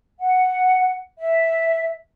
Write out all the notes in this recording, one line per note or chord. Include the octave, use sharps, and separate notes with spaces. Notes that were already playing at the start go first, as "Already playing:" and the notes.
F#5
E5